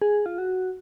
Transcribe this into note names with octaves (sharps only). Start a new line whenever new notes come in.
G#4
F4
F#4